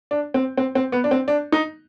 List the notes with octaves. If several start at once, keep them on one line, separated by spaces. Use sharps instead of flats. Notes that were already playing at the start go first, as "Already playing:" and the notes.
D4
C4
C4
C4
B3
D4
C4
D4
D#4